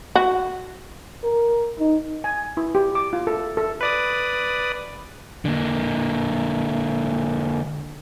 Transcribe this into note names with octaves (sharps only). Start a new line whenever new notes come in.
F#4
A#4
D#4
G#5
E4
G4
D6
F4
A4
A4
B4 D5 D#6
D3 A#3